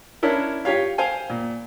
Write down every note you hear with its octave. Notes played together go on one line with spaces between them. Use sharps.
C#4 D4 E4 A#4
F4 G4 C#5 F5
C5 F5 G5 G#5
A#2